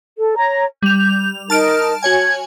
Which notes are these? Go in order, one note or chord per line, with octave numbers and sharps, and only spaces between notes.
A4
C#5 A#5
G3 G6 F7
D#4 A#4 A5 F6 D7
F#4 C#5 G#5 G#6